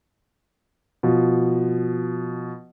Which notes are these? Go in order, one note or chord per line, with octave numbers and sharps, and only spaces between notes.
B2 F3